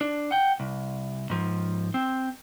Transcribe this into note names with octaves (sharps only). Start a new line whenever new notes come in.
D4
F#5 G5
C2
G#2 F3
C4